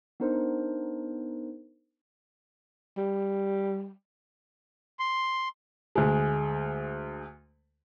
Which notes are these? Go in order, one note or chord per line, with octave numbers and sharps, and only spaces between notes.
B3 D4 D#4 A#4 C5
G3
C6
D2 G#3